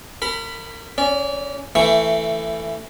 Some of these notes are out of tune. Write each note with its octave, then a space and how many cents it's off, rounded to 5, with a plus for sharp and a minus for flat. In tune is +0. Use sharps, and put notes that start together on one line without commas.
A#4 -35 B5 +5
C#4 +0 D5 -30
E3 +5 A3 +20 C#6 +0